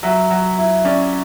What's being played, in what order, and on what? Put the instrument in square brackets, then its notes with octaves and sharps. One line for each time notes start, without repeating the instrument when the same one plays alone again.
[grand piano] F#3 E5
F#3
E4
C#4 D5